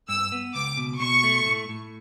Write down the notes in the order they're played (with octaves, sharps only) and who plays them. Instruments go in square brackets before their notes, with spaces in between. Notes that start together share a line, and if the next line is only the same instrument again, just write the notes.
[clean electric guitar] G2 [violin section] E6
[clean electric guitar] B3
[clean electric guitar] C#2 [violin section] D6
[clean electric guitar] B2
[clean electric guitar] B2 [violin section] C#6
[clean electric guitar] A3
A2
A2